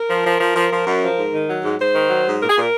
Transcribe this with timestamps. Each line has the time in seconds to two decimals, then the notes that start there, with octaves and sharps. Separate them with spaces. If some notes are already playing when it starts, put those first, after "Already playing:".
Already playing: A#4
0.09 F3
0.25 F3
0.40 F3
0.56 F3
0.71 F3
0.86 F#2
1.02 F3
1.17 G#2
1.33 D#3
1.48 F#3
1.64 G#2
1.79 G#2 C5
1.94 D#3
2.10 F#3
2.26 G#2
2.41 A#2 A#4
2.50 G#4
2.56 A#2 A#4